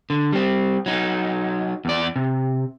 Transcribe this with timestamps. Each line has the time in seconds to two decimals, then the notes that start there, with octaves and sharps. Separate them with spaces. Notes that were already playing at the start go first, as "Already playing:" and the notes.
0.10 D3
0.32 G3 C4
0.86 F#3 D#4
1.85 E2 D5
2.16 C3